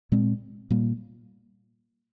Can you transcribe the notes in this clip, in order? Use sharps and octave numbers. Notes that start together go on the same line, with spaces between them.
A#2 G#3 C4
A#2 G3 A#3